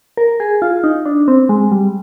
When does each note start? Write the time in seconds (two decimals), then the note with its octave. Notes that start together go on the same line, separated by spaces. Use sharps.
0.17 A#4
0.40 G#4
0.62 F4
0.84 D#4
1.06 D4
1.28 C4
1.49 G#3
1.72 G3